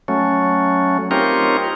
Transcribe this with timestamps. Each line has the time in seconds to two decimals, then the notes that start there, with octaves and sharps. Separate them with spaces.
0.08 F#3 A3 C#4
1.11 C4 D#4 F4 G4 A#4 C#5